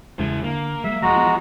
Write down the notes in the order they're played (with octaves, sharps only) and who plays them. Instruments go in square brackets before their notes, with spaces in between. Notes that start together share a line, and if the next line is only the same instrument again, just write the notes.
[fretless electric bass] E2 C#3 G#3 [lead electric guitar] E4 C5
[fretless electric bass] D3 [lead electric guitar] A#3
[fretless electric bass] F#3 G#3 [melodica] E5
[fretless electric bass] E1 [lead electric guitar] E3 F3 [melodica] G#3 F#4 A#5
[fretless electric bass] B3